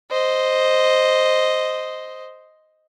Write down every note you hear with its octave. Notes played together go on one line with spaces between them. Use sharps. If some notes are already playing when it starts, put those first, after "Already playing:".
C5 D#5